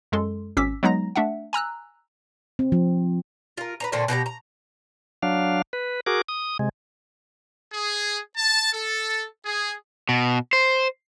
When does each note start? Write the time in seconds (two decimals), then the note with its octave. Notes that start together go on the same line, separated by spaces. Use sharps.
0.12 F#2 G#3 A4 C6
0.57 G#1 C#4 D6 E6 B6
0.83 F#3 G#3 B3 D#4 A#5 A#6
1.16 A3 D4 E5 F#5
1.53 G#5 A#5 E6 F#6
2.59 C4
2.72 F3
3.58 F4 A#4
3.80 B4 C5 A#5
3.92 A#2 D3 A3 C4
4.08 B2 G4 A4 A#5
4.26 A#5
5.22 F#3 D4 F5
5.73 B4
6.06 F#4 G#4 A#4 D6
6.28 D#6
6.59 C3 G#3
7.73 G#4
8.37 A5
8.73 A4
9.45 G#4
10.09 B2
10.53 C5